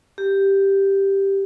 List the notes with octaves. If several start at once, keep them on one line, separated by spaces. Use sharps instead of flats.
G4